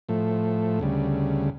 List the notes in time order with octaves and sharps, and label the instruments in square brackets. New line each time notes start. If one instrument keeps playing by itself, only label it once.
[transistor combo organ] A2 F3 A3
D2 C#3 G3